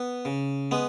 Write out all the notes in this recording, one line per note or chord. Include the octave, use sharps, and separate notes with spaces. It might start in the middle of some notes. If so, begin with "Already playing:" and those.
Already playing: B3
C#3
G#3 B3